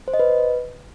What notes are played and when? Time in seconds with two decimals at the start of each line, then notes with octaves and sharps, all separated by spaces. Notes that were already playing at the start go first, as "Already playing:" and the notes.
0.08 C5
0.14 D#5
0.19 B4